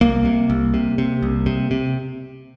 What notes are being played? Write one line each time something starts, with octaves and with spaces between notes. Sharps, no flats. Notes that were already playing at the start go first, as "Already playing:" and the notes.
C2 A#3
C3
C2
C3
C3
C2
C3
C3